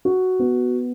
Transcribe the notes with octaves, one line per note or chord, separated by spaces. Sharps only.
F#4
B3